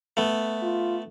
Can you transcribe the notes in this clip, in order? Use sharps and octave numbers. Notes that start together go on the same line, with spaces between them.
A3 B3
F4